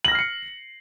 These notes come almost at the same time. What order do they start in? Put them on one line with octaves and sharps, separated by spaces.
F#7 A#6 F6 C7 C#7